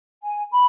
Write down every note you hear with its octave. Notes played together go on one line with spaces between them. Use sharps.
G#5
B5